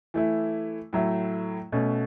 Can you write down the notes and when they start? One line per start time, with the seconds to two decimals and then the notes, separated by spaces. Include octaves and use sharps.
0.14 E3 A3 E4
0.93 A2 F#3 A3 E4
1.72 B2 A3 C#4